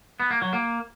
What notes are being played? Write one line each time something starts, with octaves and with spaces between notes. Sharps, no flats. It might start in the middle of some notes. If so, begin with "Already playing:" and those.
B3
A#3
F#3
A#3